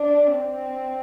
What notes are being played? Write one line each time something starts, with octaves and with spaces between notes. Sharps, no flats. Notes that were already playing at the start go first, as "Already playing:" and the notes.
Already playing: D4
C4